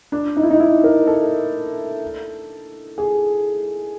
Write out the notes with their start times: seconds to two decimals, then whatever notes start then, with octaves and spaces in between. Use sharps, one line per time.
0.12 D4
0.36 D#4
0.43 E4
0.51 D#4
0.60 E4
0.84 A#4
1.07 A4
2.98 G#4